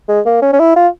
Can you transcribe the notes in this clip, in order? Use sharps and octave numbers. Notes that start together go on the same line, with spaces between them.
G#3
A#3
C#4
C#4
E4
F4